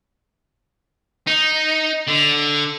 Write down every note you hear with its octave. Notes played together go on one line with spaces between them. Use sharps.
D#4
D3